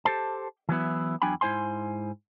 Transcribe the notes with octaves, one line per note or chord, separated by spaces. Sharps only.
G4 A4 C5 A5
E3 F#3 B3 E4
E2 F#3 D4 G5 G#5 B5
G#2 E4 C5 G#5 C6